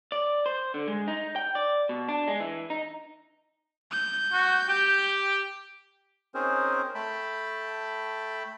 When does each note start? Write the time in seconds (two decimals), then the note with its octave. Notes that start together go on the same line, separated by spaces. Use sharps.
0.12 D5
0.46 C5
0.74 D3
0.88 G#3
1.08 D#4
1.36 G5
1.55 D5
1.89 B2
2.08 D4
2.28 G#3
2.40 E3
2.70 D#4
3.91 G6
4.32 F#4
4.68 G4 G5
6.35 C4 C#4 D#4 G#4 A#4 C5
6.95 A3 G5 A5 B5